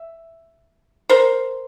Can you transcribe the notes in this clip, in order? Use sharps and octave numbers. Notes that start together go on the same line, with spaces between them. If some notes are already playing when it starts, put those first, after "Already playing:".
Already playing: E5
A#4 C5